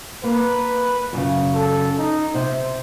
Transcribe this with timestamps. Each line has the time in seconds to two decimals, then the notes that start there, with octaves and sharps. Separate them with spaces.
0.24 A#3 B4
1.13 F#2 C#3
1.54 A4
1.99 D#4
2.34 C3 C5